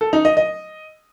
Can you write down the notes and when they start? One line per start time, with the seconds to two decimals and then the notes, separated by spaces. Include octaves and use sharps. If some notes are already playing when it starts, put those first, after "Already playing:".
0.01 A4
0.13 D#4
0.25 D#5
0.37 D#5